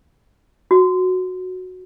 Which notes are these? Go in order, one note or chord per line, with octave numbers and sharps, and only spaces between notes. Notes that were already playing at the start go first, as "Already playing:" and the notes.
F#4